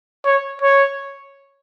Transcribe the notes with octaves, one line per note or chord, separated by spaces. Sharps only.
C#5
C#5